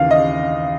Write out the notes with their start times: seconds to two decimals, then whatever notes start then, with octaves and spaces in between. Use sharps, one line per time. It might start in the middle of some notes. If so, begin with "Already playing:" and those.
Already playing: D#2 C#3 E3 F5
0.11 D#5